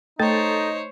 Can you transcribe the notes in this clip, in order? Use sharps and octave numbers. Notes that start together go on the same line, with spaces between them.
A3 D#4 A4 C5 C#5 A6